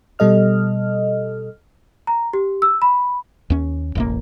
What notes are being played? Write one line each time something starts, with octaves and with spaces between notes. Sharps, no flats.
B2 G3 A4 D#5 F6
A#5
G4
E6
B5
D#2 C#4
E1 A1 A#3